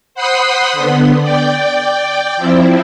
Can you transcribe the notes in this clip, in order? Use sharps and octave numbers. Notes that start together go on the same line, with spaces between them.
C5 F#5 B5 C6 D#6 B6
D3 B3
D5 G5
F3 C4 E4